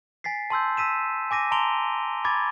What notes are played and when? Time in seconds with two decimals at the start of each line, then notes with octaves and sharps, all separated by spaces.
0.24 G#5 A6 B6 C7
0.50 A5 C6 E6 G6
0.77 E6 B6 D#7 E7
1.31 G#5 D6 A#6 D#7
1.51 A5 A#5 C6 D7 F7 G7
2.25 B5 D6 G#6 A6